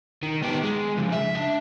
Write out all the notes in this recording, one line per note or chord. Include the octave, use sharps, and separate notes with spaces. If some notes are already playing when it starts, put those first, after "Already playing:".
D#3
B3 G4
G#3
F2 C#3
E5
D4